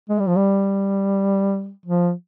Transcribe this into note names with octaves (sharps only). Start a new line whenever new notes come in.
G#3
G3
F3
G3
F3